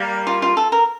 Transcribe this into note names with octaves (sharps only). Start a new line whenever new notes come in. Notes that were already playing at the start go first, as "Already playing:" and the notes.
Already playing: G3 A#3
F4
F4
A4
A#4